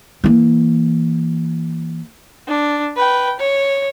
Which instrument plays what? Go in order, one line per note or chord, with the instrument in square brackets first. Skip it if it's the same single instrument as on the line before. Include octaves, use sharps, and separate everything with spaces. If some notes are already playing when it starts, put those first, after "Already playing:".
[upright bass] E3 A#3
[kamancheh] D4
B4 G5
C#5